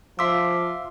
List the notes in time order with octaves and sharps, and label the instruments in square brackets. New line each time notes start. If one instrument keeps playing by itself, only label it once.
[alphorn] F3 [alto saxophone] F4 [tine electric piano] E5 C6 E6 [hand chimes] D6 B6